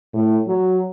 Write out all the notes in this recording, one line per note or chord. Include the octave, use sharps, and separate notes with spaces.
A2
F#3